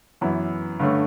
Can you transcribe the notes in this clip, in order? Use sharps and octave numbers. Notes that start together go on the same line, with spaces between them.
F#2 E3 B3 E4
G2 D3 A3 C#4